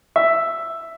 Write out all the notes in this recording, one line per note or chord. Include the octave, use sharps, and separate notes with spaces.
E5